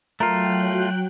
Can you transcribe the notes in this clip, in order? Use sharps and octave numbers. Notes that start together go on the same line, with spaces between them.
F#3 A3 F4 A#4 G5 F#6